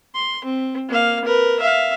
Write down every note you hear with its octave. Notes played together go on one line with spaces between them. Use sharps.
C6
C4
A#3 F5
A#4 B4
E5 F5